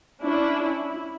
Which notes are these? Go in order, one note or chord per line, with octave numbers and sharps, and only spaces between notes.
C#4 D4 E4
E4